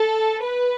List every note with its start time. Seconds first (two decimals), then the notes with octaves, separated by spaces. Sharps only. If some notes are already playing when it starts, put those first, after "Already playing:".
Already playing: A4
0.42 B4